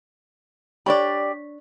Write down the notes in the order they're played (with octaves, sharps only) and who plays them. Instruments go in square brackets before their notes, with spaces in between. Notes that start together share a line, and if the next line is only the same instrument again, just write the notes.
[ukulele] D4 C#5 B5 [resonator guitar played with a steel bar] G4 D5